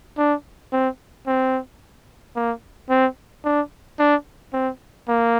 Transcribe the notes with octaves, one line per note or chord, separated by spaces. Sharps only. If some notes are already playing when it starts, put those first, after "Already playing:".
D4
C4
C4
A#3
C4
D4
D4
C4
A#3